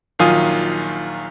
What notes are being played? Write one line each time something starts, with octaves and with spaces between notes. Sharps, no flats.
A#1 D#3 F#3 F4 G#5 D#6